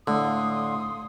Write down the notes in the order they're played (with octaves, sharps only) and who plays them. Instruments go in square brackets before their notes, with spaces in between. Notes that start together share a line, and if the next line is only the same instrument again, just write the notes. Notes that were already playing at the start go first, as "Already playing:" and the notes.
[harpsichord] A2 [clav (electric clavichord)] D3 [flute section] F5 C6 D#6